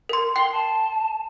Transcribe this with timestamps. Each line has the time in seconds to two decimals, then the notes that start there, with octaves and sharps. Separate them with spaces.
0.09 A#4 C6
0.36 G5 C6 C7
0.52 A5